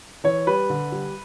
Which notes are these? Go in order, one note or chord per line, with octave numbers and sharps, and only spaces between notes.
E3 C#5
G3 B4
D3
G3